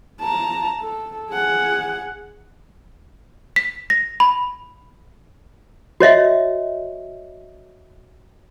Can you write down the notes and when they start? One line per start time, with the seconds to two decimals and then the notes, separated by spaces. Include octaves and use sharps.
0.21 A5 A#5
0.80 A4
1.31 G#4 F#5
3.56 B6
3.90 A#6
4.20 B5
6.00 F#4 C#5 D#5 E5